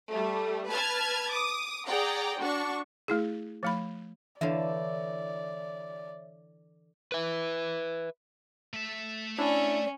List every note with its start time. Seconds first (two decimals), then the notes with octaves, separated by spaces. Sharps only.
0.13 G3 A3
0.70 B4 A5 F6 G#6
1.30 D6 D#6
1.87 G#4 D5 F#5 G5 A#5
2.39 D4 F#4 C#6
3.08 A3 E4 G#4
3.63 F3 A3 B5
4.41 D3 E3 E4 C#5 D5 E5 F5
7.12 B4 E5
8.73 A3 E5
9.38 C#4 D4 E4 D5